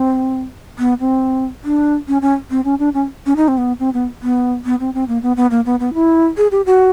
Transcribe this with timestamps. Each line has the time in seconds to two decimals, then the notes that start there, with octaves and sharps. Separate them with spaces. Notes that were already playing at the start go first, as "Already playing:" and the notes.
Already playing: C4
0.79 B3
1.00 C4
1.64 D4
2.08 C#4
2.22 C#4
2.51 C4
2.65 C#4
2.79 D4
2.94 C#4
3.26 C#4
3.36 D#4
3.48 C4
3.58 B3
3.80 C4
3.94 B3
4.22 B3
4.65 B3
4.80 C4
4.94 C4
5.08 A#3
5.22 B3
5.37 B3
5.51 A#3
5.66 B3
5.80 B3
5.94 E4
6.37 G#4
6.52 G4
6.66 F#4